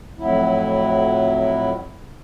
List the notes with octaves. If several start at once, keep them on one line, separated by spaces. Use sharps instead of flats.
F2 A2 F#3 E4